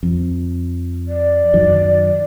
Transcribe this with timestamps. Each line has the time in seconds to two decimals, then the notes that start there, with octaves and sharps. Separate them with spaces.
0.03 F2
1.08 D5
1.53 F#2 D#3 F#3